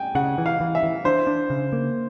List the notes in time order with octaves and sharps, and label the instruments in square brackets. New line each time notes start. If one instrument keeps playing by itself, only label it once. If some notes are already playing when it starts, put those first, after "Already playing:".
Already playing: [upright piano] G5 G#5
[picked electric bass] C#3 [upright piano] F#5
[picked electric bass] E3
[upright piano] F5
[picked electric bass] E3
[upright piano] E5
[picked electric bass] E3
[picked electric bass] D4 [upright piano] C5
[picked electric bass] D4
C#3
A#3